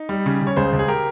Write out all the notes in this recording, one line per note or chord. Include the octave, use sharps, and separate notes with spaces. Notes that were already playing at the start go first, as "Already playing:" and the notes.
Already playing: D#4
G3
C#3
C#3
C#5
C#2 G#4 C5
C#2
G#4
G4 A#4